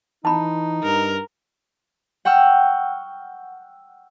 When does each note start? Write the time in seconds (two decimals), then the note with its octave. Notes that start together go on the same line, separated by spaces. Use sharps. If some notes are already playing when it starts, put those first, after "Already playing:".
0.25 E3 D#4 A5 B5
0.83 G2 A#4
2.25 F#5 G5 C#6 E6 F6